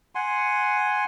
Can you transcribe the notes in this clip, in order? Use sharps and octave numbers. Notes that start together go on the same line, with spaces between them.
F#5 G#5 C6